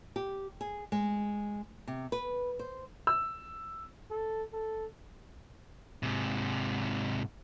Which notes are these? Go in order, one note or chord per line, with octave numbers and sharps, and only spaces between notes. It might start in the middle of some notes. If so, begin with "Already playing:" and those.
G4
G#4
G#3
C3
B4
C5
E6
A4
A4
G#2 C3